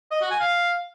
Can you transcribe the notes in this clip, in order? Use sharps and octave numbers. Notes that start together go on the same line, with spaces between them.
D#5
F#4
G#5
F5